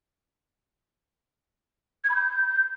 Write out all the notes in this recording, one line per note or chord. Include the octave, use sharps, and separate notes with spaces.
G#6
B5
G6